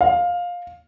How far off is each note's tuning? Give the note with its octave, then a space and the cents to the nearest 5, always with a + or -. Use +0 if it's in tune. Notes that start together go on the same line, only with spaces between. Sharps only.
F5 +15